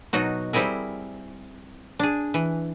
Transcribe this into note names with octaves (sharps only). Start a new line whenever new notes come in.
B2 F#3 D#4 F#4
G3 C4 E4 G#4 A#4
D4 G#4
E3